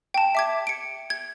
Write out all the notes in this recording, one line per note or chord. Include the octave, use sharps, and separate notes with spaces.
G5 A5
E5 D6 G#6
C#7 D7
G#6